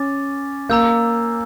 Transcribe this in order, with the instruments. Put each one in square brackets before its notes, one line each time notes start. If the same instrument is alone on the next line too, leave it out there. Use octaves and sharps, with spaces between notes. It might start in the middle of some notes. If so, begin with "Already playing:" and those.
Already playing: [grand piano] C#4 [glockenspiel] D6 A6
[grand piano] A#3 [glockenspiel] A#5 E6 G6